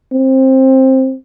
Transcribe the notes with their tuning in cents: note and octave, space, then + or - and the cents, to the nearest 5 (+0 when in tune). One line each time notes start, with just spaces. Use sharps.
C4 +15